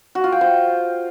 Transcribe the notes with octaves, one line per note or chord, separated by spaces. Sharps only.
F#4
F4
G5
C5